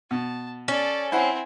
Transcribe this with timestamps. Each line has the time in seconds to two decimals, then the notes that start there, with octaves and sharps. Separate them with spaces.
0.11 B2 A5
0.68 C#4 A4 D5
1.12 C4 E4 C5 F#5 G#5